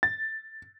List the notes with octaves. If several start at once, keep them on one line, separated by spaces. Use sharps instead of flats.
A6